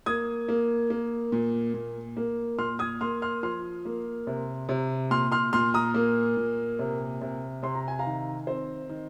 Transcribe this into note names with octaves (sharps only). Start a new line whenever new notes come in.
A#3 D#6 G#6
A#3
A#3
A#2
A#2
A#3
A#2 C6 F6
D#6 G#6
A#3 C6 F6
C6 F6
F3 C6 F6
A#3
C3
C3
A#2 C6 F6
C6 F6
A#2 C6 F6
A#5 D#6
A#3
A#2
C3
C3
C3 C6
A#5
G#5
F5 A#5
D#3
C4 C5
D#3